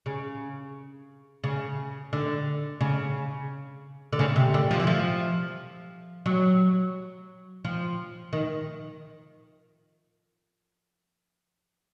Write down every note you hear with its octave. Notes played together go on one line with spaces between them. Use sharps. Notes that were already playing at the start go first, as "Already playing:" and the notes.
C#3
C#3
D3
C#3
D3
C#3
C3
D3
F3
E3
F3
F#3
F3
D#3